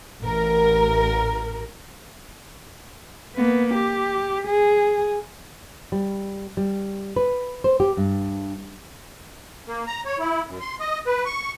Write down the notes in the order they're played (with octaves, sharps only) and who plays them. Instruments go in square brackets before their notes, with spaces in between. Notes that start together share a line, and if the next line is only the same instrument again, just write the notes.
[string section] A1 A#4
[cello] A#3 B3
G4
G#4
[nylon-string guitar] G3
G3
B4
C5
G4
G2
[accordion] A#3
A#5
C#5
E4
F#2
C6
D#5
B4
C#6